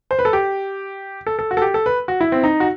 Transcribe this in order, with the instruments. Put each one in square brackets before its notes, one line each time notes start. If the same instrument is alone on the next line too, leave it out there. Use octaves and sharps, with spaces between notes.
[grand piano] C5
B4
A4
G4
A4
A4
F#4
A4
G4
A4
B4
F#4
E4
C4
D#4
F#4